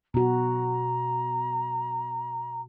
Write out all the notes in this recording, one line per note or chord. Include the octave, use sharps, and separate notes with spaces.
B2 F#4 A#5